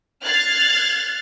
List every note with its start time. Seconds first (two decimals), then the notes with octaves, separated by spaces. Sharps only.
0.23 F6 F#6 G#6 A6 C7